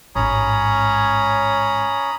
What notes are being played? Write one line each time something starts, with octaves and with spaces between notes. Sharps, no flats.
A1 G#2 C#4 C#5 A#5 B5 D#6